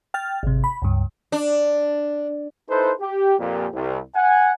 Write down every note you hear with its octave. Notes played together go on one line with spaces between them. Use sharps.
G5 F6 A6
G#1 C3
B5
C#2 G2
D4
D#4 E4 A4 B4 C5
G4
F2 A#2 A#3 G4
C2
F#5 G#5